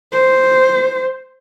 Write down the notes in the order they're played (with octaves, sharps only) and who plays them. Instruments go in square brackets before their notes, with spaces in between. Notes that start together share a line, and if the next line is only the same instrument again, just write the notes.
[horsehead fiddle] C5